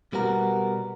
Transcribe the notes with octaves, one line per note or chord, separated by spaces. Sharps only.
B2 G3 B3 F#4 A#4